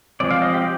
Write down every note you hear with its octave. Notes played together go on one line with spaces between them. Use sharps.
F3 G#3 C4 D5
F5
D#5
G4